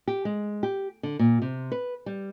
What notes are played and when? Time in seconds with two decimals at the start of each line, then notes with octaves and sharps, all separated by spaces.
0.07 G4
0.25 G#3
0.63 G4
1.03 D3
1.19 A#2
1.42 C3
1.72 B4
2.06 G3